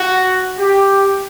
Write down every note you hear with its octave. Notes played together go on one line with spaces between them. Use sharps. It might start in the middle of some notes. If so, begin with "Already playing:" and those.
Already playing: F#4
G4